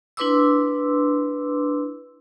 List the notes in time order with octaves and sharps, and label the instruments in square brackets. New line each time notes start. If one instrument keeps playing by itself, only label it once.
[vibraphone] D4 E4 B4 C6 D6 E6